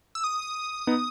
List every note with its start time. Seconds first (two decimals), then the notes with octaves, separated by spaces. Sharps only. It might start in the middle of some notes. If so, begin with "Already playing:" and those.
0.15 E6
0.24 D#6
0.87 B3 D#4